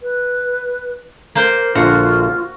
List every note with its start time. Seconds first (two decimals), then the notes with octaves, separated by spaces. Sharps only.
0.03 B4
1.35 A#3 A#4 C5 G5
1.75 A#1 D3 F4 F#4 F5